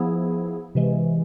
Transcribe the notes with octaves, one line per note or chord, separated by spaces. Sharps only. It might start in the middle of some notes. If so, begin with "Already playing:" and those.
Already playing: F3 B3 E4 G#4
C3 E3 G#3